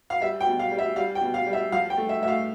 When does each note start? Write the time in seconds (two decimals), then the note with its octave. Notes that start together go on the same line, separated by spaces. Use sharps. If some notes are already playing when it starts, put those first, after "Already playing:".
0.10 F5
0.21 G3 E5
0.41 G5
0.47 B2
0.59 F5
0.72 G3
0.78 E5
0.96 G3 F5
1.15 G5
1.21 B2
1.34 F5
1.47 G3
1.53 E5
1.72 F3 F5
1.90 G5
1.97 A3
2.09 E5
2.22 A2 E5
2.28 F5